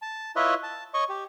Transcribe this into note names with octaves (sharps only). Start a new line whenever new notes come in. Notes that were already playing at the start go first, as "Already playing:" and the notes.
A5
E4 F4 B4 C#5 D#5 E5
A5
C#5 D#5 C#6
G4